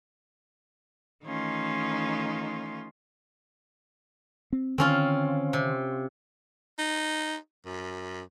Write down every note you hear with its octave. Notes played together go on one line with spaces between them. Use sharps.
D#3 E3 A3 C#4 D#4 F4
C4
D3 D#3 C4 C#4 F4
C3
D#4
F#2